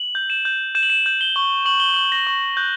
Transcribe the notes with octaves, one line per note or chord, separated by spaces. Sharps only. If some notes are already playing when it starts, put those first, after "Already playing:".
Already playing: F#7
G6
E7
G6
G6 E7
F#7
E7
G6
G7
C#6
C#6 F#7
G7
C#6 F#7
A#6
C#6
F#6 G6